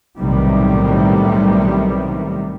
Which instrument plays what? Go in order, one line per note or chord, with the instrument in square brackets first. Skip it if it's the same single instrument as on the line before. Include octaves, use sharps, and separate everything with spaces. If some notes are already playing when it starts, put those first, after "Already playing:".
[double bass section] B1 A2 C3 D#3 G3